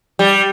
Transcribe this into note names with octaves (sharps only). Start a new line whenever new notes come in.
G3